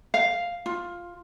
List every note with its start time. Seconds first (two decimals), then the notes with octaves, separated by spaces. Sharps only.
0.14 F5
0.66 F4